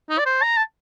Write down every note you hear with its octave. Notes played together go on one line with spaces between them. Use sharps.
D#4
D5
C5
A#5
A5